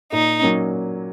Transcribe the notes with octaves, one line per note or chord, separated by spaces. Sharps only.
A#2 D#4
F#3 A#3 C#4